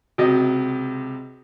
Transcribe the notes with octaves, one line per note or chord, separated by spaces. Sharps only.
C#2 C3 F#4 D#5